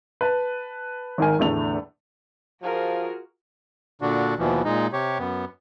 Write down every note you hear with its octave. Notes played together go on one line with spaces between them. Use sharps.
B4 A5
G#1 D#3 A#4 G#5
E2 A2 D3 A3 F7
F3 F4 F#4 G#4 A#4
A#2 D3 D4 F#4
D#2 B2 E3 F3
A#2 G#3 D#4
C3 G4 C#5
F#2 B3